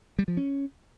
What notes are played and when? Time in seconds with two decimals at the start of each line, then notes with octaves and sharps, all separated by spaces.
0.19 G3
0.28 F3
0.37 C#4